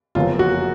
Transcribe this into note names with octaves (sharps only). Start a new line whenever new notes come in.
F#1 F#2 F3 B3 F4
F#4